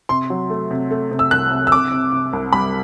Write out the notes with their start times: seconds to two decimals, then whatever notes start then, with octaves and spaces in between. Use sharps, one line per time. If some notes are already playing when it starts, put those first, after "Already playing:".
0.09 C3 C6
0.30 F#3
0.50 A3
0.71 C3
0.91 A3
1.11 C3
1.19 E6
1.31 C2 F#6
1.51 C3
1.67 E6
1.72 C3 D6
1.92 C3
2.12 C3
2.33 C2
2.53 G3 B5